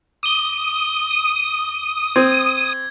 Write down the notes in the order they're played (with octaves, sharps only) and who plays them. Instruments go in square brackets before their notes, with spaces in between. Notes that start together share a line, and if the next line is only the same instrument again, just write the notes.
[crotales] D6 G7 [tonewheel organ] D#6
[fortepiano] C4 [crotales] G#6